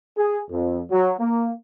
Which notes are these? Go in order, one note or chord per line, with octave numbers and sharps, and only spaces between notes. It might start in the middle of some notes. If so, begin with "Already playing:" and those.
G#4
F2
F#3
A#3